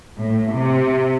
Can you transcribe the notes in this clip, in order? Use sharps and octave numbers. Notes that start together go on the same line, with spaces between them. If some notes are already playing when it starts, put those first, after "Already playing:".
A2
C3